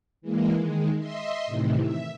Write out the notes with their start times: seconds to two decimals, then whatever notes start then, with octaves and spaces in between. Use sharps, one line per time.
0.22 E3 G#3 A#3
0.57 D#3 G#3
0.98 D#5 E5 C6
1.46 A2 C3 D#3 E3
1.80 E5